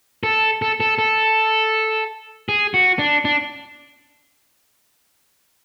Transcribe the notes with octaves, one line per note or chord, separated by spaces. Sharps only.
A4
A4
A4
A4
G#4
F#4
D4
D4